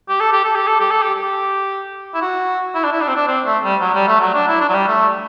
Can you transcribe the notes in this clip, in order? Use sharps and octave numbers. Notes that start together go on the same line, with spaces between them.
G4
A4
G4
A4
G4
A4
G4
A4
G4
G4
E4
F#4
E4
D4
E4
D4
C4
D4
C4
A3
G3
F#3
G3
A3
F#3
D4
E4
D4
F#3
G3
A3